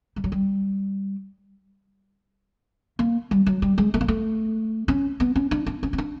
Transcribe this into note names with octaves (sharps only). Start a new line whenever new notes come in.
G3
F#3
G3
A#3
G3
F#3
G3
G#3
A3
A#3
A3
C#4
B3
C#4
D4
D4
C#4
C#4
D4